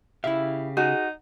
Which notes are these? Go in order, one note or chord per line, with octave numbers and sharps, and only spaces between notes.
C#3 E4 G4 E5 F5
D#4 F#4 G#4